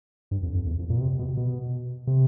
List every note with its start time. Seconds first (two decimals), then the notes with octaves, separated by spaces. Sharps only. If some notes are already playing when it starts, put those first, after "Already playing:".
0.31 G2
0.43 F2
0.55 F2
0.67 E2
0.79 F2
0.90 A#2
0.97 B2
1.01 C3
1.19 B2
1.37 B2
2.07 C3